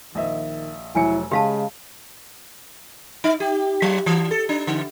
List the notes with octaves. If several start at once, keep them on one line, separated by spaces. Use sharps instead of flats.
A#1 D#3 D#5 E5
F1 F#3 E4 G#5 C#7
C#3 G#3 G4 F5 A5
D#4
G4
F#3
E3
A4
D4
D3